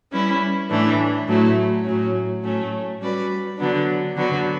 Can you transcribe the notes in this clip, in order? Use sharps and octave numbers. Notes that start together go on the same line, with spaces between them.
G3 C#4 E4 B4
A2 E3 A3 D4
A2 F#3 A3 E4
A2 F#3 C#4
A2 F#3 A3 C#4
G3 C#4 F#4 B4 D5
D3 F#3 B3 D4
D3 F#3 B3 F#4